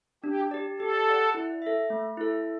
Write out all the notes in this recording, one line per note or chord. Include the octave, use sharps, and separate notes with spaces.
D4 G4
G4 D5
G4 A4
D5 F#5 A5
E4
A4 E5
A3
E4 A4